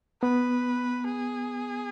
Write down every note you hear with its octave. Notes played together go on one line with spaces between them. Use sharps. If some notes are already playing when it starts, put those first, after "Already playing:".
B3 B4
G#4